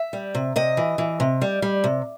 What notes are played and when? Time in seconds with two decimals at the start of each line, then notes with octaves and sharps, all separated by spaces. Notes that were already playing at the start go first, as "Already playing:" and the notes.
Already playing: E5
0.13 G3
0.35 C3
0.56 C3 D#5
0.77 E3
0.98 E3
1.20 C3
1.42 G3
1.62 G3
1.84 C3